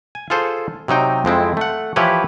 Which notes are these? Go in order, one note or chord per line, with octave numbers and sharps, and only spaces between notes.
G#5
F4 G#4 A4 C5
C3 F#3 D#4 G5
F2 G#3 C4 E4
A3 F#5
E3 F3 E4 G4 B4 C#5